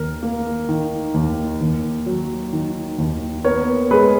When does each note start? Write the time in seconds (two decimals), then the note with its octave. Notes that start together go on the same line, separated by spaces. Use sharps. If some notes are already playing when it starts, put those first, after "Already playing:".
Already playing: D#2 A#4
0.23 A#3
0.68 D#3
1.14 D#2
1.61 D#2
2.06 F#3
2.53 D#3
2.98 D#2
3.44 B3 A#4 C#5
3.91 G#3 G#4 B4